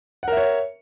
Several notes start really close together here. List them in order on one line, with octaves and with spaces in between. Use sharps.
F#5 A#4 E5 C#5